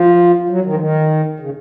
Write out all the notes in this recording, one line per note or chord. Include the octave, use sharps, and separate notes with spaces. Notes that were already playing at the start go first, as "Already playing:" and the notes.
Already playing: F3
F#3
D#3
F3
D#3
C#3